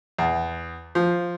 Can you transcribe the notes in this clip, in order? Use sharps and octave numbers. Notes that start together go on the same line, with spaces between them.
E2
F3